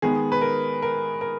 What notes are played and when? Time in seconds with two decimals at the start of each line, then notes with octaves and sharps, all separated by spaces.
0.02 D#3 G#3 B3 G#4
0.32 B4
0.41 A#4
0.82 A#4
1.21 A#4